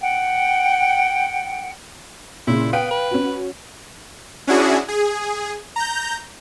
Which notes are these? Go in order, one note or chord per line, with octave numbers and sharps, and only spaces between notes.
F#5 G5
A#2 C#3 E4
B3 F5 G5 D7
B4
C#4 F#4
C#4 D4 E4 F#4 G#4
G#4
A#5 G6